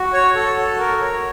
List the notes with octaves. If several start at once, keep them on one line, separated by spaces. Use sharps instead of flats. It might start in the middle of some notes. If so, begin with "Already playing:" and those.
Already playing: F#4
C#5
A4
F#4
A#4
C#5